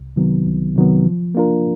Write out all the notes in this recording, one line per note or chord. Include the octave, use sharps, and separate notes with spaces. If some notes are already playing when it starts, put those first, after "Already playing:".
Already playing: C2
C3 D#3 F#3 B3
C2
C3 D#3 F#3 B3
F3
A#3 D4 F4 A#4